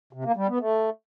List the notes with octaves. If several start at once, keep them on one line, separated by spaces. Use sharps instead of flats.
C3
A#3
G3
B3
A3